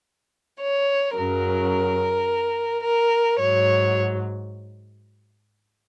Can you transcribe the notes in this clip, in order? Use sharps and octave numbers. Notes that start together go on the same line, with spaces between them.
C#5
F#2 C#3 F#3 A#4
A#4
G#2 F#3 C#5